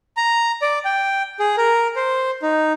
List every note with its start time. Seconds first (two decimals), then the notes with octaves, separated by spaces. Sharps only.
0.17 A#5
0.62 D5
0.85 G5
1.39 G#4
1.57 A#4
1.96 C5
2.42 D#4